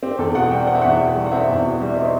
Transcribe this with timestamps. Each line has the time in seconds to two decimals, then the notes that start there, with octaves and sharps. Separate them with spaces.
0.03 C4 G4
0.19 E2 A4
0.35 B2 F#5
0.51 G3 G5
0.67 C4 F#5
0.75 E5
0.82 E2 F#5
1.00 B2
1.16 G3
1.26 F#5
1.32 C4 E5
1.49 E2
1.65 B2
1.81 G3
1.88 E5
1.96 C4 D#5
2.05 C5